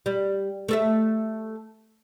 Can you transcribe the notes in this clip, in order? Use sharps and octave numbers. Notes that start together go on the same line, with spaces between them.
G3
A3 A4 E5